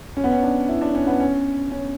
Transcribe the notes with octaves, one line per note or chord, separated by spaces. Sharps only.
C#4
B3
C#4
D4
E4
D4
C#4
B3
C#4
C#4